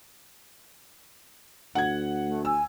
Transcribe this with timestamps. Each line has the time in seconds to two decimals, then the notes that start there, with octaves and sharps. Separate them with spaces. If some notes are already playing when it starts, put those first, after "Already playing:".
1.75 D2 F#5 G#6
2.26 A3
2.45 G#5 E6